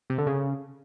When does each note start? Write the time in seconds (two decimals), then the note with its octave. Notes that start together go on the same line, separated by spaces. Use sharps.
0.10 C3
0.18 D3
0.27 C#3